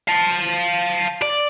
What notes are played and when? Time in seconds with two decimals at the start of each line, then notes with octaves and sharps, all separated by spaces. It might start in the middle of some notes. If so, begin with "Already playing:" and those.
0.08 F5 A5
1.22 D5